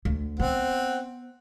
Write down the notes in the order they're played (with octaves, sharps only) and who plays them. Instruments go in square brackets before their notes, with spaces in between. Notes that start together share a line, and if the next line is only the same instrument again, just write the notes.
[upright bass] D2
[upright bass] B3 [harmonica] C4 F#5